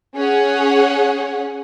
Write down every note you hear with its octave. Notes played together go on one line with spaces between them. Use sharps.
C#4 G#4 C#5 F#5